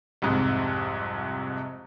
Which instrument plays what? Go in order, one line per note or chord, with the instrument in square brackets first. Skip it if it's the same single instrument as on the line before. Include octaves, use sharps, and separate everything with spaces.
[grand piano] C2 F2 G#2